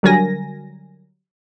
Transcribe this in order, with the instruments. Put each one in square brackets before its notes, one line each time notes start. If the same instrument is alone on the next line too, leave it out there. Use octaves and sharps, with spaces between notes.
[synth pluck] D3 F#3 G3 A#4 G#5 A#6